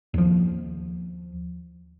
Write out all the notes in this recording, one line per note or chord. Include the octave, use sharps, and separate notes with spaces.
D#2 F3